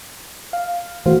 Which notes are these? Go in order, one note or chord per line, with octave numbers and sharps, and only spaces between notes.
F5
E3 A3 F#4 C5 F5